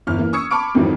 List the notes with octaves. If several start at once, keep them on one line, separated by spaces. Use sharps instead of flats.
G1 E2 F6
E3 A#3
C#6 D#6 E6 G#6 C#7
A5 B5 C#6 D6 F6 D7
F2 G#2 D#3 E3 F#3